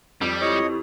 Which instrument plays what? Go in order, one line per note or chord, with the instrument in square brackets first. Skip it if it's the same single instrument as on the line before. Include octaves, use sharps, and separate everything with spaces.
[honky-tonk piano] F2 [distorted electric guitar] G3
[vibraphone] E4 G4 C#6 [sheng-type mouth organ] C#5 D#5